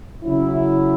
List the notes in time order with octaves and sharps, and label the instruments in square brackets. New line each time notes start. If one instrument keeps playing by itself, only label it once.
[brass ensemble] C#3 F#3 C#4 E4